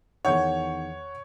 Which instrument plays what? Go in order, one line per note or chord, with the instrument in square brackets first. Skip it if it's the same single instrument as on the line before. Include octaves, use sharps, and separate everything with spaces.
[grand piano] E2 D#3 [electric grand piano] C#5 [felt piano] F#5 G6